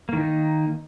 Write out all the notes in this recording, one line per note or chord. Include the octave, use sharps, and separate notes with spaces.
D#3 A#3 D#4